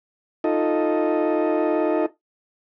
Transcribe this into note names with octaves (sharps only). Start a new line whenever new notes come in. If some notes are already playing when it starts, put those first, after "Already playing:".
D#4 F4 A4 D#5